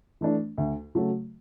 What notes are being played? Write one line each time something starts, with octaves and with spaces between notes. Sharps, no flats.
E3 A3 D4
D2
C#3 F#3 A3